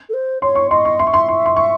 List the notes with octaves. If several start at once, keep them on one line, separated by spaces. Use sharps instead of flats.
A4
C5
C#5 C6
C#6
D#5 C6
C#6
E5 C6
C#6
C6
C6
C6
C#6